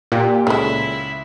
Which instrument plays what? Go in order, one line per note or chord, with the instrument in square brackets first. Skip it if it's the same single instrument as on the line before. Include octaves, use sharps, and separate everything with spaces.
[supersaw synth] A#2 [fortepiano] G4
[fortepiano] C#2 [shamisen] G#3 A3 [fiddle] E4 E5